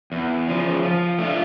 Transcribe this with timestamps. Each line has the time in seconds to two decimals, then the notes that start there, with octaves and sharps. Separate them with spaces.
0.12 E2
0.48 C#3 F3
0.83 F3
1.19 A3 D4 F4